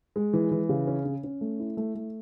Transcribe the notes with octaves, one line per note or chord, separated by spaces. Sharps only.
G#3
E3
E3
C#3
C#4
C#4
C#4
A3
E4
A3
A3